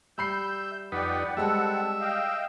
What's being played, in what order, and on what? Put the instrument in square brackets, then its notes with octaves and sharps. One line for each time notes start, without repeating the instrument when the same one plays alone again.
[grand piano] G3 B5 C7 [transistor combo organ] E5 [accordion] G6
[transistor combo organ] F2 D#4 B4 [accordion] G4 D5 F#5
[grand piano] G3 G#3 E6 [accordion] C4 A4 F#5 [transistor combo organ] E5
[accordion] D#5 F5 G5